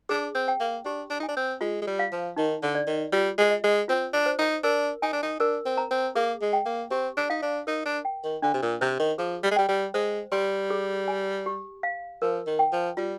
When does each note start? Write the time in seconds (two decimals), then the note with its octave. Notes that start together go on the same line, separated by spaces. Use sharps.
0.09 D4 G#4
0.35 C4
0.48 G5
0.60 A#3
0.85 D4 G4
1.10 D4
1.20 D#4
1.23 G#5
1.28 D4
1.36 C4
1.61 G#3 F4
1.82 G#3
1.87 G3
1.99 F5
2.12 F3
2.36 D#3 D#4
2.63 D3
2.75 D5
2.87 D#3
3.12 G3 F4
3.38 G#3
3.51 D#5
3.64 G#3
3.88 C4 F4
4.13 D4
4.26 C5
4.39 D#4
4.63 D4 A#4
5.02 D#4 G#5
5.13 D4
5.23 D#4
5.39 D4 A#4
5.65 C4
5.77 A#5
5.91 C4
6.15 A#3 G#4
6.41 G#3
6.53 G5
6.65 A#3
6.91 C4 G4
7.17 D4
7.30 D#4 F5
7.42 D4
7.67 D#4 A#4
7.85 D4
8.05 G5
8.23 D#3
8.42 D3 D4
8.54 C3
8.62 A#2
8.81 C3 C5
8.99 D#3
9.18 F3 G#4
9.43 G3
9.51 G#3
9.56 G3 G5
9.68 G3
9.94 G#3 C5
10.32 G3 C6
10.70 G#4
11.08 G#5
11.46 G4
11.83 F5
12.22 F3 A#4
12.46 D#3
12.59 G5
12.72 F3
12.97 G3 F4